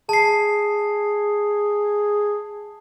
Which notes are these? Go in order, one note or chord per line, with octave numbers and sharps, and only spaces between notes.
G#4 A5 C7